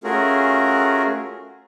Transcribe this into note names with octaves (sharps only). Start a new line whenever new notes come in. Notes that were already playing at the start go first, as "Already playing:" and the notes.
A3 C#4 F4 F#4 G#4 A#4